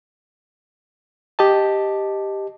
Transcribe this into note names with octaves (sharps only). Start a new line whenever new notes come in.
G4 D#5 A5